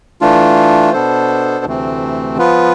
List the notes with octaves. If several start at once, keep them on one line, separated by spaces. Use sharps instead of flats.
E3 A3 D4 F4
B2 B3 D4 A4 C5
D2 C3 E3 A3 C4
F3 B3 F4 B4